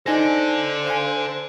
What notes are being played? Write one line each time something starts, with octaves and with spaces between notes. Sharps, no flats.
D#4 A4 C5 D5 G#5 A#6
F5 G#5